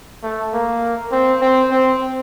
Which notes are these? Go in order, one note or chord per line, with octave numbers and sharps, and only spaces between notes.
A3
A#3
C4
C4
C4